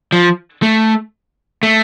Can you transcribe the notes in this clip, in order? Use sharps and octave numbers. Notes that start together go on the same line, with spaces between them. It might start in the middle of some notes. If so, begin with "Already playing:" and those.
F3
A3
A3